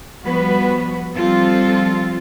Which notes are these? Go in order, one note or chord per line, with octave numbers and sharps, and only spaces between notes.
F3 G3 B3 F#4 B4
F3 G3 C4 F4 A4